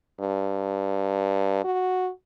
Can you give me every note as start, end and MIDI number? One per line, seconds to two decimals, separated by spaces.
0.20 1.59 43
1.64 2.10 66